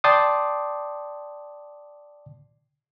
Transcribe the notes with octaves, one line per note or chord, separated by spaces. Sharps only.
D5 G5 A5 C6 D6 D#6